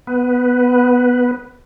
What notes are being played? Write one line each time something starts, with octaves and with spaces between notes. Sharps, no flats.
B3 B4